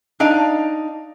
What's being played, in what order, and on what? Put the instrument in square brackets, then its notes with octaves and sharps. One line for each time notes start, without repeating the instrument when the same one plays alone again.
[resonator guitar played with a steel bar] D4 D#4 D5 F5